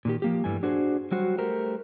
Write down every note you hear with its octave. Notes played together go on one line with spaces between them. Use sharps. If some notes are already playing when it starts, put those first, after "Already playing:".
A#2 D#3 G4
F3 A#3 G4
G2 E3 G3 A3 G#5
D4 F#4 G#4 C5
F#3 G3 F#4 C5
A3 G4 A#4 C5